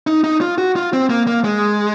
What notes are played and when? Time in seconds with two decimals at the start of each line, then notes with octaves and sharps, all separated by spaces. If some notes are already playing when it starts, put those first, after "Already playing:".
0.07 D#4
0.24 D#4
0.41 F4
0.58 F#4
0.76 F4
0.93 C4
1.10 A#3
1.27 A#3
1.44 G#3